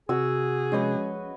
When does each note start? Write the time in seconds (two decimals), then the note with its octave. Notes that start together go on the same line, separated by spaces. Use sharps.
0.09 C3 F#4 G#4 E6
0.72 F3 G#3 C#4 B4 C#5 D#5